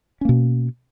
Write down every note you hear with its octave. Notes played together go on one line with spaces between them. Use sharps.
B2 A#3 C#4